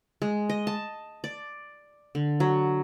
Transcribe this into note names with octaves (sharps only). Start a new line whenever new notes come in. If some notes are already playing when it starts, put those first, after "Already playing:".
G#3
D#5
A5
D5
D3
F#3